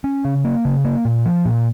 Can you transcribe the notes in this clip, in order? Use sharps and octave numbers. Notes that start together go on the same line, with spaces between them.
C#4
C#3
A#3
C#3
A#3
A#2
F3
A#2